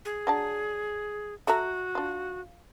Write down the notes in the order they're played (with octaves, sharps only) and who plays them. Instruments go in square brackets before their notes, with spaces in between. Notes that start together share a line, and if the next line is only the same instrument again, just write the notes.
[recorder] G#4
[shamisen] F#3 D4 A5
[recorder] F#4 [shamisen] A4 E5 A#5
[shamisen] D4 F4